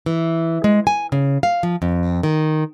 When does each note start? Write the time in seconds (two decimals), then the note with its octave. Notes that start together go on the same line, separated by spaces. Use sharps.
0.06 E3
0.64 G#3
0.87 G#5
1.12 C#3
1.43 F5
1.63 F3
1.82 F2
2.23 D#3